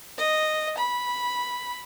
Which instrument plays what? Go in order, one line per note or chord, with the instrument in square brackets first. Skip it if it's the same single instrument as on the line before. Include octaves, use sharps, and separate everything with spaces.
[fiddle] D#5
B5